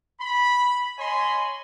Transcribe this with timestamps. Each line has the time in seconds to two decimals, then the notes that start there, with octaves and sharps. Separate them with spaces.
0.20 B5
0.99 C#5 D#5 G#5 B5 C6